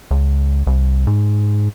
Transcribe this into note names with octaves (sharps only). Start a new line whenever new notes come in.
C#2
C2
G#2